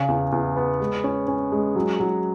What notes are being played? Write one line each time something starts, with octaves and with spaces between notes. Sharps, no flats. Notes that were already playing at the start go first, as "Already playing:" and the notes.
Already playing: C#3
E2
E2
B3
G#3
C#4
C#4
G#3
F#3
F#3